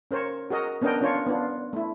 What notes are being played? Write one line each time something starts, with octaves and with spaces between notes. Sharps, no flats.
C#4 A#4 C5 C#5
F#4 G#4 A#4 D#5
B3 C#4 D4 A#4 D#5 G5
C#4 D4 F4 C#5
B3 D4 F4
A3 E4